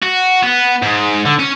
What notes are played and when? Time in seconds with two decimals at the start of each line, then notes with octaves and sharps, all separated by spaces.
0.03 F#4
0.43 B3
0.82 G#2
1.26 D3
1.39 C#4